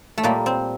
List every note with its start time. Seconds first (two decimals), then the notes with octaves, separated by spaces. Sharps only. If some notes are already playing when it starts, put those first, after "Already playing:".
0.18 A3
0.23 A#2 G3 A#3
0.46 C4